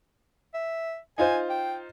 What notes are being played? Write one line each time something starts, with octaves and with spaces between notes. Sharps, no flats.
E5
D#4 F4 C5 G#5
G5